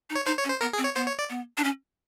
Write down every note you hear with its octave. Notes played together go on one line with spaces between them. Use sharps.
D#4
C#5
D#4 C5
C#5
C#4
C5
B3 A#4
G#4
C4
C#5
B3 C5
C#5
D5
B3
D4
C#4